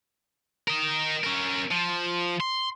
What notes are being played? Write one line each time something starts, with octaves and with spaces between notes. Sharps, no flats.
A#4 D#5
C#4 A#4
F3
C6